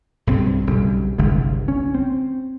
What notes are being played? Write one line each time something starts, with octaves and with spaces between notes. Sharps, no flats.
B1 G2 C4
B1 C#3 G3
G1 C2 D3 G#3
C#4
C4